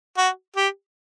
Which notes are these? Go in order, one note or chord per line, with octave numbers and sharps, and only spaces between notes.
F#4
G4